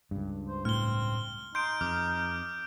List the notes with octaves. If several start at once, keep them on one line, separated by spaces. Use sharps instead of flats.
C#2 G2
C5
A2 C4 F6 G7
D#4 C6 G6 D7
F2 D6 F6